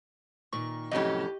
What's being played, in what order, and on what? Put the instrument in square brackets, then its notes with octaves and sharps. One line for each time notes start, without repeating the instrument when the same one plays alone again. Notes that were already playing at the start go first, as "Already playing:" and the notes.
[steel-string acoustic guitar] A#2 D#3 [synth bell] C#6
[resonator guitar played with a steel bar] F2 A2 [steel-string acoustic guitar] C3 F#3 C#4 [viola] G4 [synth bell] D#5